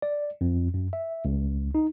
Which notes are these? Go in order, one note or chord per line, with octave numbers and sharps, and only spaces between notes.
D5
F2
F#2
E5
C#2
D#4